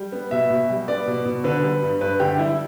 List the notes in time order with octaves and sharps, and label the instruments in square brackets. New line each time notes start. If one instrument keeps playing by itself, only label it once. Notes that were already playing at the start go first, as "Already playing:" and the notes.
Already playing: [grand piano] G3
B3
B2 E5
B2
G3
B3 D5
B2
B2
D3 B4
G3
G2
G2 B4
D3 G4
G3 E4